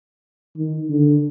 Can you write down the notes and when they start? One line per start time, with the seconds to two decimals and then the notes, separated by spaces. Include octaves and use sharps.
0.57 D#3
0.90 D3